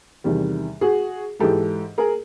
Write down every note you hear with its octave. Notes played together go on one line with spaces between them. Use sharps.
E2 C3 D#3 G3
F#4 G#4
G#2 E3 G#3 G4 A4
G#4 A#4